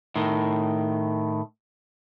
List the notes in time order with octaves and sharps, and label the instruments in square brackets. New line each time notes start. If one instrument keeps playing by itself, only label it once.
[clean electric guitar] A2 D#3